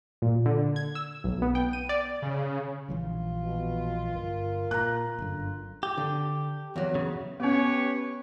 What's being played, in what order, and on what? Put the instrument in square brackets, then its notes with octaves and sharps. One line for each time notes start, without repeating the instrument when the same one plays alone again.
[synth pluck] A#2
D3
G#6
E6
B1
B3
G5
D#7
D5
[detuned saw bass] C#3
[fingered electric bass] A#1 E3 G3 [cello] F4
[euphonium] B2
[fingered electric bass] G1 [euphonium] A#4
[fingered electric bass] A#2 [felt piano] A#5 F#6
[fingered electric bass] G1 F#2 D3
[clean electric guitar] G4
[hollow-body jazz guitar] D3
E2 F#3
[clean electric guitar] C#3
[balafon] B3 C#4 [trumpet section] G4 B4 C#5